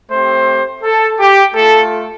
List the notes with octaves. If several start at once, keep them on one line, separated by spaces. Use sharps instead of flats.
A3 C4 G4 C5
A4
G4
A3 F4 A4